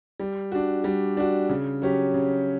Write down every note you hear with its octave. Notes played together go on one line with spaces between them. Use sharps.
G3
D4 F#4
G3
D4 F#4
C#3
F#3 C#4 G4
C#3